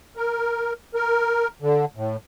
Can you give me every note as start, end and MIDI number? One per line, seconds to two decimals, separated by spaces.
0.16 0.73 70
0.94 1.48 70
1.62 1.85 50
1.96 2.17 45